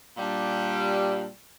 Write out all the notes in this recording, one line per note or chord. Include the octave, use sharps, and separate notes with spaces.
A#2 G3 D4